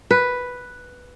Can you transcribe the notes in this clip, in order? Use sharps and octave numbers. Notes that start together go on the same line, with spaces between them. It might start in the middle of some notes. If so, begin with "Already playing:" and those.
B4